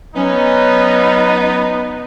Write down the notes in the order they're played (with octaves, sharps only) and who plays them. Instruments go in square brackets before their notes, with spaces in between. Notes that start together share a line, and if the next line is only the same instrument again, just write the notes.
[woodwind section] F#3 C#4 [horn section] B3 D#4